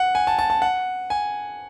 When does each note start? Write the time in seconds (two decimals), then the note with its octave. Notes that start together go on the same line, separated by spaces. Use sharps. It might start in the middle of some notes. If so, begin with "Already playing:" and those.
Already playing: F#5
0.15 G#5
0.27 A5
0.39 A5
0.50 A5
0.62 F#5
1.10 G#5